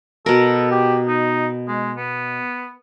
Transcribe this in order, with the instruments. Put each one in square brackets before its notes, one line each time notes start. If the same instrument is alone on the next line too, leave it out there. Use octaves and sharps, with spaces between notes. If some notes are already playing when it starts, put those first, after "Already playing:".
[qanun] B2 A#4 [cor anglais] A4
[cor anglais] G4
D#4
G#3
B3